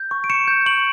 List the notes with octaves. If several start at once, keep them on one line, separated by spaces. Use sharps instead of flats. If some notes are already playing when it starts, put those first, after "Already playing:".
Already playing: G6
C#6
D7
C#6 C#7 E7
G6
C#6 D7 F#7